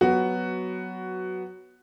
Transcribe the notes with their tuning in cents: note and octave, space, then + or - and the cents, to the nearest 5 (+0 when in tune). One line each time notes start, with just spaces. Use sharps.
F#3 +5 B3 +0 F#4 +10